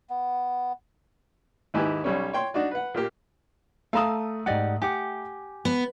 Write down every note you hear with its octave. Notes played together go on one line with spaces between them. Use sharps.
B3
D#2 G#2 E4 G4 B4 G#5
B1 G3 C#4 C#5
C#5 G5 C6
D4 D#4 F#4 D5
B4 F#5
A#2 A#3 G4
A3 A4 F5 A5 A#5 D#6
G#2 G4 D5 D#5 F#5
G4 F#5 G#5 D6
B3